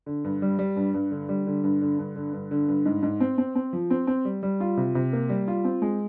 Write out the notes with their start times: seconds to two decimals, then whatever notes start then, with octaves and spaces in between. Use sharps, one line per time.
0.06 D3
0.24 G2
0.42 G3
0.59 G3
0.76 G2
0.94 G2
1.11 D3
1.29 G3
1.47 D3
1.64 G2
1.81 D3
1.99 G2
2.16 D3
2.33 G2
2.51 D3
2.68 G2
2.85 G#2
3.03 G#2
3.20 C4
3.38 C4
3.55 C4
3.73 F3
3.90 C4
4.07 C4
4.25 G3
4.43 G3
4.60 F4
4.77 C3
4.95 C3
5.13 A#3
5.29 G3
5.48 F4
5.64 C4
5.82 G#3